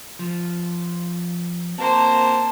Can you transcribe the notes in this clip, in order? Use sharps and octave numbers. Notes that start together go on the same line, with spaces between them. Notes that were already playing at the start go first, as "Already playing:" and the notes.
F3
A#3 C4 F#4 C5 A5